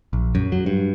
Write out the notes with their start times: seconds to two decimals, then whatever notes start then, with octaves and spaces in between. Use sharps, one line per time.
0.13 A#1
0.35 F#2
0.52 F#3
0.66 G2